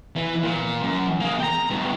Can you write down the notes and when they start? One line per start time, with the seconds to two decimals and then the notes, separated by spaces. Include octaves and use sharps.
0.16 E3
0.43 A#2
0.83 F#2
1.20 A#3 G#4
1.40 G5 A#5
1.70 G2 B2